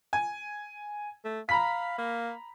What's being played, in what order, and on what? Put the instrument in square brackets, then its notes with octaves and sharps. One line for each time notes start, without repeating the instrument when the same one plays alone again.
[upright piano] G#5
[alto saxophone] A3
[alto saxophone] F5 [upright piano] A#5 B5 B6
[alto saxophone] A#3